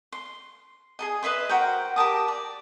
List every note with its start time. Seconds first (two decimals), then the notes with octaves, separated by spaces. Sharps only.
0.12 C6
0.99 G#4 A4 D#5
1.23 B4 D#5 E5 C6
1.49 F#4 A#4 C5 G5
1.96 G4 A#4 A5 D#6
2.28 D5